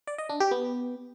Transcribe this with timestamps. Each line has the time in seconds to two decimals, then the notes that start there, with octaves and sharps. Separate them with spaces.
0.07 D5
0.18 D#5
0.29 D4
0.40 G4
0.51 B3